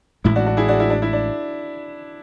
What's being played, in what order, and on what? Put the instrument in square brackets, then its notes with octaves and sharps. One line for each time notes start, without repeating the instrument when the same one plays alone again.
[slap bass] A1 A2 G#3 [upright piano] E4
[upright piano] D4 F#4
D4 F#4
E4 G#4
D4 F#4
E4
D4
E4
D4